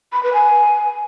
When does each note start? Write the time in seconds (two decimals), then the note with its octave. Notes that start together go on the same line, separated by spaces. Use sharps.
0.13 B5
0.23 B4
0.33 G#5